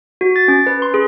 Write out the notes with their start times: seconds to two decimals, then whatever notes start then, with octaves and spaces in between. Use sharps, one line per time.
0.21 F#4
0.36 A6
0.48 C#4
0.67 B4
0.82 C6
0.94 G#4